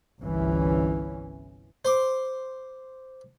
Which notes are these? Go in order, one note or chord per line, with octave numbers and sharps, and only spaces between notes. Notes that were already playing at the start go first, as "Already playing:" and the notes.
G1 C2 E3 C#4
C5 C6 D6